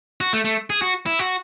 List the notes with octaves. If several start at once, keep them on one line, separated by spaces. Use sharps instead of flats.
F#4
A3
A3
G#4
F#4
E4
F#4